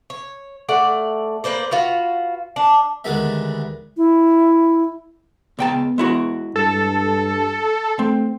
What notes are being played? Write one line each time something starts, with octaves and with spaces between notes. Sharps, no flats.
C#5
A3 D5 F#5
A#3 B4 C5 D5
F4 F#4 B4
D4
D2 D#3 G3 G#3 B3 E5
E4
C#2 B3 G5 A5
G#3 E4 F#4
G2 A4
A3 C4